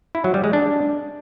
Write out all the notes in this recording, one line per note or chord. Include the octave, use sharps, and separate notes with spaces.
E4
F#3
G3
G#3
D4